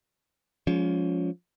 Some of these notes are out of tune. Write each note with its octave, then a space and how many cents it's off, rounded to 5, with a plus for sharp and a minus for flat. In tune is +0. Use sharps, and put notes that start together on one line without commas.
F3 +20 G#3 +0 C#4 +30